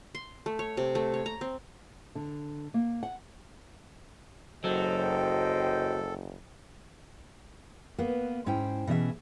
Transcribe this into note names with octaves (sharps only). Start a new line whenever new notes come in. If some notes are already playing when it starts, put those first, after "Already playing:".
C6
A3
C#5
C3
A3
C#5
A#5
C4
D3
A#3
F#5
F#1 F#3 A4 C5 D#5 G5
A#3 B3 B4
G#2 C#4 E4 C5 G5
B2 E3 C#4 G#4 C#5 E5